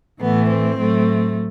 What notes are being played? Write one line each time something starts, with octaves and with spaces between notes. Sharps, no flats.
A2 E3 A3 B3
C4
A2 F#3 A3